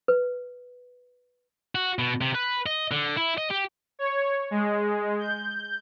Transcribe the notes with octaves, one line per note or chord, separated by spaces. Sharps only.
B4
F#4
B2
C3
B4
D#5
D3
E4
D#5
G4
C#5
G#3
G6